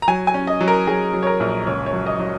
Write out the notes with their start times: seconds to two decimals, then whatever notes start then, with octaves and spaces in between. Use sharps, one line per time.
0.02 A#5
0.08 F#3 G#5
0.27 G#5
0.34 C#4
0.47 D#5
0.61 F#3
0.68 A#4
0.87 F#3 G#4
1.13 F#3
1.23 C#5
1.27 A#4
1.40 A#1
1.67 C#2 C#5
1.86 C#5
1.93 F#3
2.06 D#5
2.19 F#3